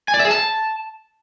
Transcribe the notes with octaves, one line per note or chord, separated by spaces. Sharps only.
G#5
D5
E5
G#4
A5